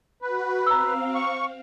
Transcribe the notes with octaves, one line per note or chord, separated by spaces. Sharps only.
F#4 B4
C4 F5 A#5 E6
C#6